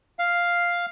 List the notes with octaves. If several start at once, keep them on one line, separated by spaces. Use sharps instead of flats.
F5